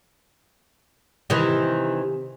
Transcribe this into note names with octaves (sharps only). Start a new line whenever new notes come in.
C3 D#3 E3